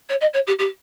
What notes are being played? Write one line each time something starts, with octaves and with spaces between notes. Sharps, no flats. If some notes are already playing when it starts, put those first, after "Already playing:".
C#5
D#5
C#5
G4
G4